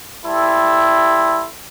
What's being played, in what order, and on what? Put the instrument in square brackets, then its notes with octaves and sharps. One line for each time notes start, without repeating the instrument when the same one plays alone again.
[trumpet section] G3 E4 A4 C5